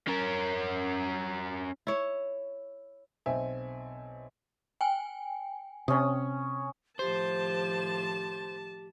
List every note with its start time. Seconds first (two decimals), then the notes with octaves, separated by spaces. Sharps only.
0.08 C#4 A#4
1.87 E4 C#5
3.26 B1 C4 E5 G#5
4.81 G5 G#5
5.88 C3 C#4 C#5 D#6
6.99 A2 D#3 F3 G4 C5 A5